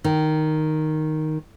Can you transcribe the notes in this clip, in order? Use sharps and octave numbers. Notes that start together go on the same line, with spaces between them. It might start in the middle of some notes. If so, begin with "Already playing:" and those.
D#3